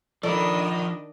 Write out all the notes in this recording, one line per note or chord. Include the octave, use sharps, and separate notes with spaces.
D#3 F3 D4 A4 A#4 D5 D#5 B5